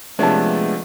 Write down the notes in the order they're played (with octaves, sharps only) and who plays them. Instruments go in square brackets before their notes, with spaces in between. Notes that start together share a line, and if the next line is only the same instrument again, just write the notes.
[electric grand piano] C3 F3 D4 [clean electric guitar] G#3 B3 [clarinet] A3 [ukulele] C#5 A5